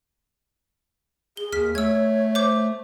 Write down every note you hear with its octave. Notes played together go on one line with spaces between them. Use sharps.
G#4 G7
D#2 F6 B6
A3 C#5 E6 G#6
C5 D6 G6